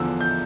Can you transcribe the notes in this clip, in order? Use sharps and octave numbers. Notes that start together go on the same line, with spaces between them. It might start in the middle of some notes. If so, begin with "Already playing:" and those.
Already playing: E2 D3 F3 E6
G6